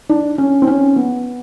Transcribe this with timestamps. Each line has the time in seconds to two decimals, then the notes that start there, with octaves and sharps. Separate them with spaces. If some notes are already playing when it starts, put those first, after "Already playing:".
0.09 D4
0.38 C#4
0.62 C4
0.67 C#4
0.96 B3